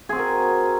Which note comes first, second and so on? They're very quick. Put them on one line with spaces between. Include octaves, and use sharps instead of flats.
G#4 C4 F#4 A#4